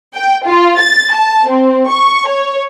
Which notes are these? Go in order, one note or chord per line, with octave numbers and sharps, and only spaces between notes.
G5
F4
A6
A5
C4
C#6
C#5